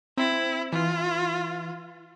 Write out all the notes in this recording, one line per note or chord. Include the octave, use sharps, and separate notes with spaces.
C4 E4
E3 F4